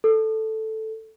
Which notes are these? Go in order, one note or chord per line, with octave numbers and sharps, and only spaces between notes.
A4